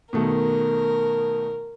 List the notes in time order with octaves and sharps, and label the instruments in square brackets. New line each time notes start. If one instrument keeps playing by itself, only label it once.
[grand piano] B2 D#3 A3 [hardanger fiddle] A#4